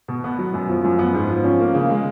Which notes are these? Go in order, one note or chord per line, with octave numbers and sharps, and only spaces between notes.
B2
B3
F#3
F#2
F3
F#2
B3
G#2
F3
C#4
A#3
C#3
G#3